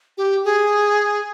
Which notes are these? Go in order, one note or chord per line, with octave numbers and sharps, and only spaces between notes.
G4
G#4